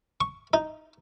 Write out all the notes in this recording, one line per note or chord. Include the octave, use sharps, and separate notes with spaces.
C#6
D#4